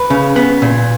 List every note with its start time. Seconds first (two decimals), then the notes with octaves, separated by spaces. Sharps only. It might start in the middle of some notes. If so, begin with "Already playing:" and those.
Already playing: B4
0.10 C#3
0.36 B3
0.62 A#2